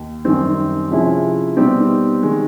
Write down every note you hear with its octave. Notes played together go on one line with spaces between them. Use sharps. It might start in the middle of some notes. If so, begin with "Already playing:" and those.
Already playing: D#2
F#2 D#3 G3 C4
C3 F3 G#3 C#4 E4
B2 G3 C4 D#4 G4
D#3 G#3